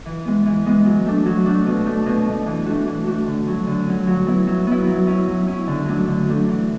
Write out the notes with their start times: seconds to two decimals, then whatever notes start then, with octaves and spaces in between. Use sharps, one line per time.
0.06 E3
0.25 G#3 B3
0.46 E3
0.66 G#3 B3
0.86 F#3
1.06 A3 D4
1.26 F#3
1.46 A3 D4
1.66 B2
1.86 A3 D4
2.06 B2
2.26 A3 D4
2.46 E3
2.66 A3 D4 F#4
2.86 E3
3.06 A3 D4 F#4
3.27 D3
3.47 F#3 C#4
3.67 D3
3.87 F#3 C#4
4.07 F#3
4.27 B3 E4
4.47 F#3
4.67 B3 E4
4.87 F#3
5.07 C#4 E4
5.28 F#3
5.47 C#4 E4
5.67 D3
5.86 F#3 A3 D4
6.08 D3
6.27 F#3 A3 D4
6.48 E3